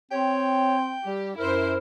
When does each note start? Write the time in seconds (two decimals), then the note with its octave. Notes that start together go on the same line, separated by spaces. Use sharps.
0.11 C4 C#5 G5
1.05 G3 G4
1.37 F#2 E4 A#4 C5